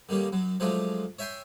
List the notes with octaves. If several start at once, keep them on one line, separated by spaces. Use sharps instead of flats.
D3 D#3 G3 A#3 C#4
F#2 F#3
F3 F#3 G#3 A3 D4 F4
C#5 E5 G5 G#5 C6